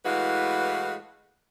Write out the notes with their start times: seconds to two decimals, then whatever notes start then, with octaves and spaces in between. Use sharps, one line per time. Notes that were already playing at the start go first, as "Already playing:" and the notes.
0.05 A2 E3 G#3 F#4 B4 F5